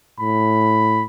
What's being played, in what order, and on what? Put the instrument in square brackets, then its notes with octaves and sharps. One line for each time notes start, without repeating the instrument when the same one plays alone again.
[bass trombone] A2 [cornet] B5